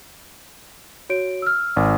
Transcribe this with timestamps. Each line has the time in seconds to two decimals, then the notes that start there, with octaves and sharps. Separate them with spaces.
1.09 F#4 C#5 D7
1.42 E6 F6
1.76 G#1